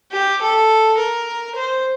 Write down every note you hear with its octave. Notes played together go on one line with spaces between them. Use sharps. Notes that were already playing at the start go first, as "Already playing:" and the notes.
G4
A4
A#4
C5